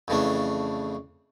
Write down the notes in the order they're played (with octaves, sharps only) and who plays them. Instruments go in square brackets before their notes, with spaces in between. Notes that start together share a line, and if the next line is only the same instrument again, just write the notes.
[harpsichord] F2 C#3 E3 A3 D4